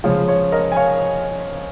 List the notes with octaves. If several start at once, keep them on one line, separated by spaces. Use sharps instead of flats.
C#3 F3 G#3 C#5
C#5
A#4 D#5
G#5
C#5 F5